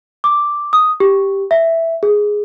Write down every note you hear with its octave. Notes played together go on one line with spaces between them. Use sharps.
D6
D#6
G4
E5
G#4